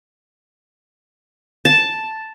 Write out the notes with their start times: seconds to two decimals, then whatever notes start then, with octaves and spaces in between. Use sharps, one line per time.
1.65 A5